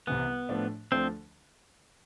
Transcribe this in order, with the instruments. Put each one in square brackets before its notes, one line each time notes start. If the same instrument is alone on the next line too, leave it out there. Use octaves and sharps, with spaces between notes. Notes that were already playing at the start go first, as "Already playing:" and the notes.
[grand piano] C2 C3 E3 [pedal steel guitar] B3
[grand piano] A2 F3 A3 D4
[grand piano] D2 D3 F3 A3 D4 [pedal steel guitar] C4